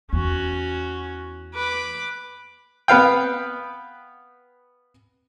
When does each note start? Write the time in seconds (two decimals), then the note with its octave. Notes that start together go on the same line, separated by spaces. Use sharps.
0.13 E2 C#4 F#4
1.54 B4 D6
2.88 B3 B4 F5 G5